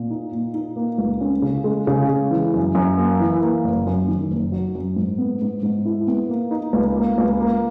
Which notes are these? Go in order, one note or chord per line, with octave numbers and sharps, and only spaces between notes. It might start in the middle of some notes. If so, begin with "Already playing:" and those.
Already playing: A#2
D#4
A#2
D#4
A#3
C#2
C#4
C#3
G#3
C#3
G#3
E3
F#2
F#2
A#3
E3
A#3
F#1
F#2
D#3
F#1
F#3
F#2
G#2
B3
G#2
G#2
E4
B3
A#3
D#4
C#2
A#3
C#2
A#3